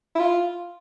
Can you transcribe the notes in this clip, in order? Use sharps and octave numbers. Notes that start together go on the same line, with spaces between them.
E4
F4